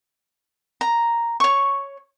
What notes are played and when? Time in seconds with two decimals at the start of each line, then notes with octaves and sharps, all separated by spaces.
0.81 A#5
1.40 C#5 C#6